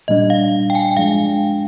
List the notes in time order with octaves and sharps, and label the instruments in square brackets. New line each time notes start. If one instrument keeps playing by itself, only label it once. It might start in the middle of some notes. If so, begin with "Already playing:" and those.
[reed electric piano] A#2 G3 D4 [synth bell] D#5
[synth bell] F5
G5
G#5
[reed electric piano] G2 F3 G#3 D4 [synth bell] F5